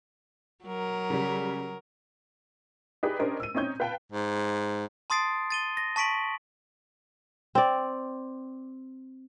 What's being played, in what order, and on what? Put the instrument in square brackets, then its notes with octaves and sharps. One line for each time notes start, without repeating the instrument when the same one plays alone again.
[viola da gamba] F#3 A#4
[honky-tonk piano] C#3 G3
D#4 G4 G#4 B4 D5
C#4 D4 G4 A#4 C5 D#5
E6 D#7
C4 C#4 D#4 C#5 G6
B4 F5 G5 A5
[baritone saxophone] G#2
[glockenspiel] A5 C6 D#6 A6 C7 D7
A6 D#7 G7
A#6
A5 C#6 B6 D7 F#7
[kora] C4 D5